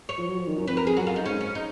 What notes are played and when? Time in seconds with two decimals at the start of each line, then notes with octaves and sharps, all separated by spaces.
0.09 C#5
0.18 F3
0.28 F#3
0.39 F3
0.48 D#3
0.58 F#2
0.67 F2 B4
0.77 A#4
0.87 G#4
0.97 F#2 F#4
1.07 F4
1.16 D#4
1.26 G#2 C#4
1.41 C#4
1.55 D#4